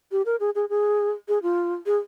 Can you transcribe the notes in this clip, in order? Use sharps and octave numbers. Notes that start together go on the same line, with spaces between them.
G4
A#4
G#4
G#4
G#4
G#4
F4
G#4